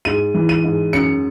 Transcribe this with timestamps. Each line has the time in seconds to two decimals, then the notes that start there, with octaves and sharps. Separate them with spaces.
0.05 G#2 D#7
0.34 E3
0.49 D#7
0.64 G#2
0.93 F#2 C#7